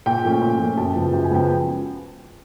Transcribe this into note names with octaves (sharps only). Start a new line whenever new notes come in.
A#2 G5
F3 A3 C#4
A#2
F3 A3 C#4
F#2 A5
C#3 F3 G#3 B3
F#2 G5
G#5
C#3 F3 G#3 B3 G5